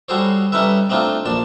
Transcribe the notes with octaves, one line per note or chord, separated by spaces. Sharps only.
G3 F#4 G#4 A4 C5 C#5
G3 C#4 D#4 A4 B4 E5
A3 C4 D4 D#4 F4
A#1 D4 A5